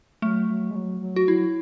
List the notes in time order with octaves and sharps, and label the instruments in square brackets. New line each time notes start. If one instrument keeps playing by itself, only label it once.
[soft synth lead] F#3 [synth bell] A3
[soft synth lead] F#3
G#3
F#3
F#3
[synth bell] F#4
[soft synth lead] F#3 [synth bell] E4